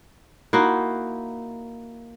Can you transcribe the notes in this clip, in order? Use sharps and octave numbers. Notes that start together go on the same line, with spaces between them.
A#3 D#4 E4 F#4